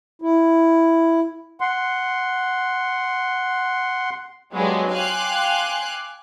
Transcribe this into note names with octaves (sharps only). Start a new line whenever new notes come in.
E4
F#5 C6
F#3 G#3 B3 D4 F4 G4
F5 G5 G#5 C6 D6 F#6